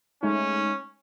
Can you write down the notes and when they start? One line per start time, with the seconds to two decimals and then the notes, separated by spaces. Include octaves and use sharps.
0.23 G#3 A3 C#4 D#4